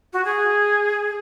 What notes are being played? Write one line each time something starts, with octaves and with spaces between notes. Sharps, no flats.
F#4
G#4